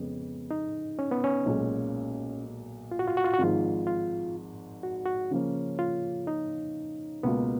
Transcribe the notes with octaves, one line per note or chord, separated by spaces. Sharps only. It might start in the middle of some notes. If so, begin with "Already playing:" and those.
Already playing: F2 C#3 G#3 B3
D#4
C#4
B3
C#4
B1 A#2 G#3
F4
F#4
F4
F#4
F4
F#4
G#1 G#2 F3 G#3 F4
F4
F#4
F#4
C#3 F3 A#3 C#4
F4
D#4
C#2 B2 A#3 B3 F4